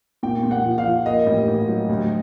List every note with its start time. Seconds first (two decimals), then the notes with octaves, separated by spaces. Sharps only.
0.23 A#2 G5
0.43 A#2
0.51 F#5
0.65 F3
0.78 F5
0.85 F3
1.05 A#3 D#5
1.26 A1
1.48 A1
1.68 F#3
1.89 D2